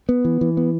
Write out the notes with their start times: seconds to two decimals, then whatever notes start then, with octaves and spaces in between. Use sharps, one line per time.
0.09 B3
0.25 E3
0.41 E3
0.57 B3